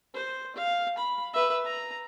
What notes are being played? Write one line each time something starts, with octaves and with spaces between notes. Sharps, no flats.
C5
F5
B5
B4 E5
A#5